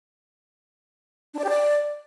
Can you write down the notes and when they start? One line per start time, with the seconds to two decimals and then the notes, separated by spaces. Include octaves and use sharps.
1.34 D4
1.39 D5
1.44 G4
1.49 D5